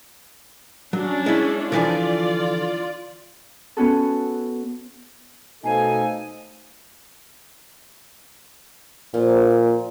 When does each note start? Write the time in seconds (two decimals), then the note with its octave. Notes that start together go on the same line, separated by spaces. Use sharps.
0.93 F#3 C#4 D4
1.26 G#3 E4
1.72 D3 E3 F3 F4 D5
3.77 B3 C#4 F#4 A4
5.64 B2 A3 D#4 A4 C5 F5 G#5
9.14 A#2 F3